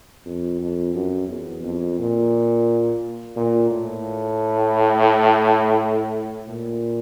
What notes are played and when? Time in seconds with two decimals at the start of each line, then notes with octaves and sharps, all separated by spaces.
0.25 F2
0.60 F2
0.94 F#2
1.28 E2
1.63 F2
1.99 A#2
3.36 A#2
3.71 A2
6.48 A#2